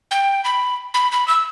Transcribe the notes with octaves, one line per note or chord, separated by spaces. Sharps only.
G5
B5
B5
B5
E6